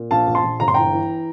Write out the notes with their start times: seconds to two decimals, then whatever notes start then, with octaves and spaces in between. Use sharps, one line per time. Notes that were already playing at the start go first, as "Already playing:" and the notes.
Already playing: A#2
0.11 A#1 F5 A5
0.27 A#1
0.35 A5 C6
0.44 A#1
0.60 G1 A#5
0.68 C6
0.74 E3 G5 A#5
0.93 E3